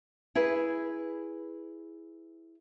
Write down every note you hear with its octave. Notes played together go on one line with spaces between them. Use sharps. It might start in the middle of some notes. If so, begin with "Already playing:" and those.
E4 G#4 B4